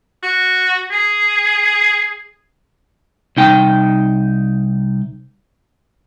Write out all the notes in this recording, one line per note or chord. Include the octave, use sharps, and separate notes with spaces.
F#4
G#4
C2 D#4 G5